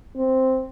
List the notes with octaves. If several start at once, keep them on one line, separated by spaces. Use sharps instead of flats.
C4